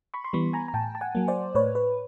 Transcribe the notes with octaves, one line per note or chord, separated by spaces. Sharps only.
B5 C#6
C6
E3 G3 B3 B5 C#6
G#5 A#5
A#5
A2 G5 A5
A5
F#5 G#5
F#3 A#3
C5 D5
A2 B4 C#5
B4